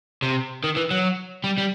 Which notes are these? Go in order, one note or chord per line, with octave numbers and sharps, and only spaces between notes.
C3
D#3
E3
F#3
G3
G3